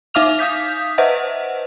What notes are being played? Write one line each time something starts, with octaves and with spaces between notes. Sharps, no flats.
D#4 E5 F5 D6 F6 F7
F5 D#6 G6 B6
B4 C5 D#5 E5 F#5